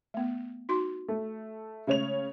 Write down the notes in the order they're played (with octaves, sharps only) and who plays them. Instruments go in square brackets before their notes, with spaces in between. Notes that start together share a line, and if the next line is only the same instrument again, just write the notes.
[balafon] A3 B3
D#4 F#4 C6
[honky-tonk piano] A3
[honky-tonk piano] C#3 C#5 F7 [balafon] G#3 A3